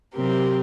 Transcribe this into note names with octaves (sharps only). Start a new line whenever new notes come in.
C3 F#3 C4 G4 A#4